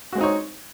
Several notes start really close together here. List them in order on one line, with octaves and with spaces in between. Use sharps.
F#4 G#3 C4 D#4 C#5